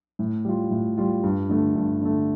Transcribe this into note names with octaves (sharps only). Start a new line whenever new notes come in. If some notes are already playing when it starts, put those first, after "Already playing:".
A2
G3 F4
A2
G3 F4
G2
D3 A3
G2
D3 A3